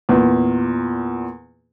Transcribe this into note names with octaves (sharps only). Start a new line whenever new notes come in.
E2 A#2